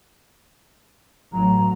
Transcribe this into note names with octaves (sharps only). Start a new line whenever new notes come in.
A1 F#3 A#5